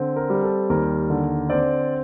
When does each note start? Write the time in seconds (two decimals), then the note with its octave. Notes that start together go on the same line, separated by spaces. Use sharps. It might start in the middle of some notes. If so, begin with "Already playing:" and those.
Already playing: D3 C4
0.16 A#4
0.30 G3
0.43 A4
0.69 D#2 A#4
1.10 D3
1.50 C4 D5